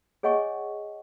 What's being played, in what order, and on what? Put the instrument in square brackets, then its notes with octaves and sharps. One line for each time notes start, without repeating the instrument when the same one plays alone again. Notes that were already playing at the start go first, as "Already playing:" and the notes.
[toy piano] G#4 C#5 D#5 F#5 G#5 C#6